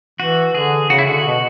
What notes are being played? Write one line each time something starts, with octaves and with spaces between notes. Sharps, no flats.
E3 F#4
D3 G#4
C#3 F#4
E4
D3 F#4
B2